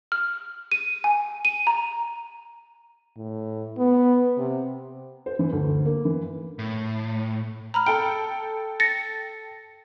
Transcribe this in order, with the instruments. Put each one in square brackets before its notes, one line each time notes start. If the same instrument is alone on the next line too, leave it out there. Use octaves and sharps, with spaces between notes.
[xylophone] F6
D#7
G#5
D#7
A#5
[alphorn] A2
B3
C3
[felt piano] C5
E3
D2
A#3
E3
[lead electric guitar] A2
[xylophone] A#5 B5 F6
[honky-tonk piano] A4 G5 [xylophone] D7
[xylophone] A6 A#6 C#7